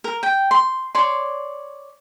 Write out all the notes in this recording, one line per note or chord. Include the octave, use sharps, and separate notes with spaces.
A#4
G5
C6
C#5 D5 C6